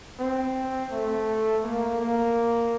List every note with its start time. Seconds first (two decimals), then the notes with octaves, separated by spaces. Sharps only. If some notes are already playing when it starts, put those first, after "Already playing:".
0.19 C4
0.92 A3
1.64 A#3
2.00 A#3